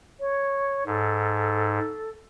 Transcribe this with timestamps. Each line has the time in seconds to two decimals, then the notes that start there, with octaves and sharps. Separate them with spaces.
0.20 C#5
0.86 G#2 A4